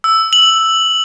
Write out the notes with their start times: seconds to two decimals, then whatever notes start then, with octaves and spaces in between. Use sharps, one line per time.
0.04 E6
0.33 F#7